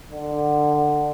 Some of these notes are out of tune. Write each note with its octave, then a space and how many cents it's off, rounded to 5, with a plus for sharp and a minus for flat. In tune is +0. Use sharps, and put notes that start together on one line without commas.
D3 +15